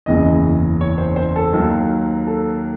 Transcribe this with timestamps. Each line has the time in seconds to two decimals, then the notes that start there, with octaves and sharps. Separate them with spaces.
0.06 F#1 E2 C#3 E3 D#5
0.81 C#5
0.98 C5
1.16 C5
1.36 A4
1.53 D#2 D#3 F#3
2.27 A4